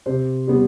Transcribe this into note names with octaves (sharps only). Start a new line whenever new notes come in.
C3 C5
G3 B3